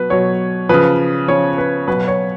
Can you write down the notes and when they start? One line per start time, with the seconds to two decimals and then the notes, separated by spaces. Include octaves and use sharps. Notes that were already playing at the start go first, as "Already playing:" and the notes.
Already playing: B2 F#3 B4
0.10 B2 F#3 C#5
0.69 C#3 F3 B4
1.28 C#3 F3 C#5
1.58 B4
1.88 B2 F#3 B4
2.08 C#5